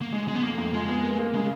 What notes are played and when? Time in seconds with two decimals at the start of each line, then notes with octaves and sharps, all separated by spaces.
0.02 A#3
0.13 G#3 D#4
0.28 B2 G#3
0.35 B3
0.43 F2 A#3
0.58 F2 A#3
0.73 G#3 F4
0.89 B3
1.03 A#3
1.19 A#3
1.34 C#3 G#3